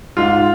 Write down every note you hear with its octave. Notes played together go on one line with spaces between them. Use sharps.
G#2 F4